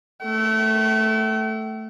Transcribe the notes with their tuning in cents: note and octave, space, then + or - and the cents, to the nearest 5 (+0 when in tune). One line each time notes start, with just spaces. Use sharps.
A3 +0 G5 -45